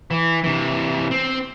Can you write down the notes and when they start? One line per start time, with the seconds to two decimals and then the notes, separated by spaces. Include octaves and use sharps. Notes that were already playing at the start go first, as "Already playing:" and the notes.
0.11 E3
0.44 C3 E3
1.11 C4